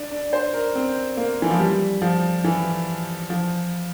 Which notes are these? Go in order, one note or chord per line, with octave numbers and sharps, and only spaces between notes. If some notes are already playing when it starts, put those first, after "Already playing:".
Already playing: D4
D4
C5
A#4
C4
A#3
E3
F3
G3
F3
E3
F3